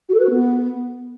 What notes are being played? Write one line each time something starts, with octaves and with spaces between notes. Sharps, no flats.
F#4
A4
B4
F#4
B3